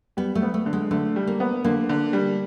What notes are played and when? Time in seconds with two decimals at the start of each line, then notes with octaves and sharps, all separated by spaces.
0.17 G3 B3
0.35 A3
0.42 B3
0.54 A3
0.66 D3
0.73 G#3
0.91 D3 A3
1.16 G3
1.27 A#3
1.40 B3
1.64 D3 A#3
1.89 D3
2.13 G3